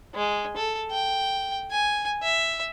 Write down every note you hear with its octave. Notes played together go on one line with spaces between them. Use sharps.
G#3
A4
G5
G#5
E5